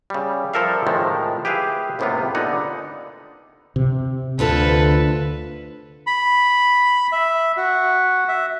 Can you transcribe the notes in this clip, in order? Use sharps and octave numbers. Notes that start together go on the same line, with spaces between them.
C#3 G3
F3 G3 A4 A#4 E5 F5
A2 C3 D#3 F3 G#3 A3
G4 G#4 B4 E5 F5
C#2 A2 C3 A#3 B3 F4
A#2 D3 B3 D#4 F#5
C3
D2 D3 F4 A4 B4
B5
E5
F#4
E5